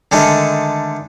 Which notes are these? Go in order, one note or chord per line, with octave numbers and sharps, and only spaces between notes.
D3 D#3 G#3 A3